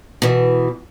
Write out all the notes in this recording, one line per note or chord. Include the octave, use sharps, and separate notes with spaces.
B2 E3